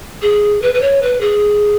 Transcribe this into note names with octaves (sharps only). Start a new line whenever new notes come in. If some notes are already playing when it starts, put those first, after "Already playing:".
G#4
B4
B4
C#5
B4
G#4